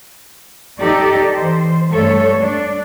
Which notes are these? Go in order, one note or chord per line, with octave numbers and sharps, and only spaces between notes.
D#4 G4 A4 D5
E3 C5
G2 G3 A3 A4 C#5
D4